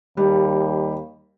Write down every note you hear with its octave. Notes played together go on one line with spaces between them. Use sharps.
D#2 G3